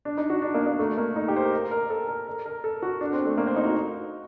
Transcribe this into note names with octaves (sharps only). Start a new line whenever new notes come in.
D4
D#4
F#4
D4
A#3
A#3
A3
A#3
D#4
G4
C5
A#4
A#4
A#4
A4
A#4
A#4
A#4
A4
F#4
D4
C4
A3
A#3
C4
D#4
F#4